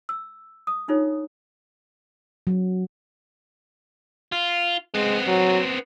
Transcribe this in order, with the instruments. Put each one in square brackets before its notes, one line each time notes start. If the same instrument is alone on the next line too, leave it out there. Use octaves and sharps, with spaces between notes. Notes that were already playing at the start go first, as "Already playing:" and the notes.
[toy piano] E6
D#6
D4 D#4 F4 A4 C#5
[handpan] F#3
[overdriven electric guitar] F4
[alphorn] G#3 [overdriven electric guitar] B3 C4
[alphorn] F#3